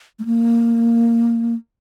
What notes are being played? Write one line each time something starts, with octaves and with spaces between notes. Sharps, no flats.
A3
A#3